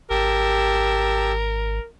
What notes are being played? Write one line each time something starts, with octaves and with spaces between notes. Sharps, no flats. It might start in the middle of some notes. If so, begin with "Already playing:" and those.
G#1 G4 A#4 A5 E6